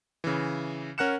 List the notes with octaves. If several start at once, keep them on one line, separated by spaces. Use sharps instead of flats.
C#3 E3
C#4 A#4 F#5 F#6 C#7 E7